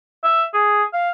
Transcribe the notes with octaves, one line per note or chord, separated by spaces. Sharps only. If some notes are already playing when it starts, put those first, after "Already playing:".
E5
G#4
F5